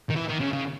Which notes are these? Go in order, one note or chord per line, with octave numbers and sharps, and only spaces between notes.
D#3
E3
D#3
C#3
C#3